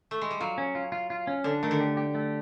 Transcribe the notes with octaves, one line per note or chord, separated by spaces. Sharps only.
A3
G#3
G3
F#3 F4
C#4
F4
F4
F4
C#4
D3 D4
D#3 A3
D3
G4
G4
A3